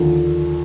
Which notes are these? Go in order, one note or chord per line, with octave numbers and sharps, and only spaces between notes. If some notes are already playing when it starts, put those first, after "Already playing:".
Already playing: D#2 D3 F3